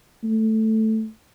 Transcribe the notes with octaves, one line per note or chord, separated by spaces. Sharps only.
A3